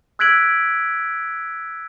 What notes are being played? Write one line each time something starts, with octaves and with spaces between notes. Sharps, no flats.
E6 F#6 G#6 B6 D7 F#7